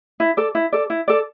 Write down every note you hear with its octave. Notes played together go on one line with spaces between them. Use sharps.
E4
A4 D5
E4
A4 D5
E4
A4 D5